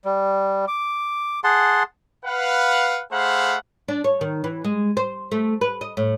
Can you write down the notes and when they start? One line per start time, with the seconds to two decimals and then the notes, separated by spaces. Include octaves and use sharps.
0.05 G3
0.68 D6
1.44 G#4 F#5 A5 C6
2.25 B4 F5 F#5
3.12 A3 G#4 C5 F5 F#5 B5
3.88 D4
4.04 C#5
4.21 D#3
4.44 E3
4.64 G#3
4.97 C5
5.32 A3
5.61 B4
5.81 D#5
5.97 A2